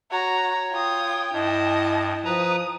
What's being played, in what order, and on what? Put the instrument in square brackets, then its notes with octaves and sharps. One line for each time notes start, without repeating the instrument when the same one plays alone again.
[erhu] F#4 [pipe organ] C#5 [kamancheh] A#5
[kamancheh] F4 D#6 [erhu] G5
[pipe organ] G2 [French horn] E4 [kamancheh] D#5 A5
[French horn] F3 [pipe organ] B4 A#5 [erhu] D#6